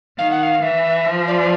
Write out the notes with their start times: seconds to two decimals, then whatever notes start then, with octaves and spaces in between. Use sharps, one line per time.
0.18 D#3 F5
0.31 F#5
0.43 F5
0.62 E3 E5
1.05 F3
1.27 D5